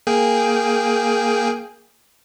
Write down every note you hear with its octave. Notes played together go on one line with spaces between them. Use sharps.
A#3 G#4 G5